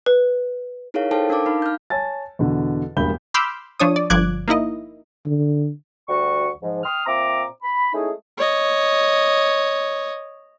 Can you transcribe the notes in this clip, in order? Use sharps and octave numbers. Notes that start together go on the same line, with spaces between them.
B4
D#4 E4 G#4 A#4 C#5 F5
D#4 A4 C5 F5 G5 A5
D4 A#4 F5 A5 D6
D#4 F5 B5
F6 G6
C#5 G#5 A5 A6
E2 B2 D3
E1 G2 A#3 B5 G6 G7
B5 C6 D6 E6 F6 G6
F3 D4 C#5 D#6
D5
G1 F3 D6 F#6 G#6
A#3 D#4 E4 D#5
D3
D2 G3 F#4 C#6
G#2 F3
G5 C6 D#6 F6
A#2 C4 E5 A#5 D6
B5
G#3 A3 C#4 D#4 E4 G#4
C#5 D#5